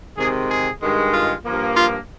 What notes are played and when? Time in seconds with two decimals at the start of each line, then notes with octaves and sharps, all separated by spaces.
0.17 C3 D#3 G#3 G#4
0.50 G#4
0.82 G2 D#3 G#3
1.13 F4
1.45 G2 F3 A#3
1.76 F4